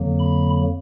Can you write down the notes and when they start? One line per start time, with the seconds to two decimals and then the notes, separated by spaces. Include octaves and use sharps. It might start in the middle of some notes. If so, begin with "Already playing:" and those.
Already playing: F2 D3 F#3 A#3
0.20 B5